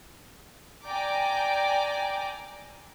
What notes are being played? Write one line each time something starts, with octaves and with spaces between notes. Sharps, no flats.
D5 G5 G#5 A#5 D6